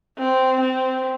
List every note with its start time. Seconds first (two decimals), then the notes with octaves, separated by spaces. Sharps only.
0.18 C4
0.61 C4